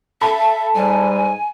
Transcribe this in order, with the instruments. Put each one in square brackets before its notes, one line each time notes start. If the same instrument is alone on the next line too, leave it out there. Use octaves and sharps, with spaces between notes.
[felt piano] A4 B5 [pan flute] E5
[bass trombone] G#2 [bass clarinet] G3 [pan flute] G#5